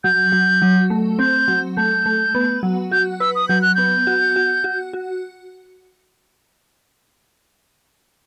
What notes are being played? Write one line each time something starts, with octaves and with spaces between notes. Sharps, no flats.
F#3 G6
F#3
F#3
A3
C4 G6
F#3
A3 G6
A3
B3
F#3
F#4 G6
B4 E6
D#6
F#3 G6
F#6
B3 G6
F#4
F#4
F#4
F#4